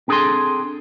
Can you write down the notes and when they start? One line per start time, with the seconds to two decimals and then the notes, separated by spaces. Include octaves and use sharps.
0.08 C4 D4 G#4 A4 G#5 C6